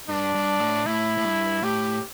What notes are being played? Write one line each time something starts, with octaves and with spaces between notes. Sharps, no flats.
G2 D4
G2
A2
A2 E4
A2
G2
A2 G4